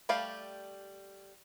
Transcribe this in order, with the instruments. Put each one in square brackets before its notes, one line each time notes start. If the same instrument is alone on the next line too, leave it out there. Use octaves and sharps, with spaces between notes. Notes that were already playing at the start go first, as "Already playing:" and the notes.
[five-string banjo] G3 A3 G4 D5 F5